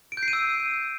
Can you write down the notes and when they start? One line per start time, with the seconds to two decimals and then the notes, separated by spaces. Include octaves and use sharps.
0.12 D7
0.17 G6
0.23 C7
0.28 D#7
0.33 E6